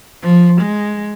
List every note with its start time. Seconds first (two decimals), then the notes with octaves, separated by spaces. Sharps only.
0.23 F3
0.61 G#3